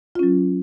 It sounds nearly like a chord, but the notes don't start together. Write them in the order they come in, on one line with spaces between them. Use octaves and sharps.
F4 C#4 F#3